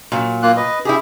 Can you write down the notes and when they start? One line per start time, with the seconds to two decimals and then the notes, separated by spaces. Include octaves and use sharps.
0.12 A#2 F#3
0.43 A#3 F4 F#6
0.56 B4 D#5
0.85 E4 G4 G#4